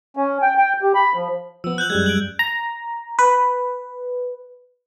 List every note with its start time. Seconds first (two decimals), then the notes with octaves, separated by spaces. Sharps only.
0.17 C#4
0.42 G5
0.58 G5
0.82 G4
0.95 B5
1.14 F3
1.64 F3 B3 E6
1.78 F#6 G6 F#7
1.90 F#2 G3 G#3 G#6
2.06 D7 F#7
2.39 A#5
3.19 B4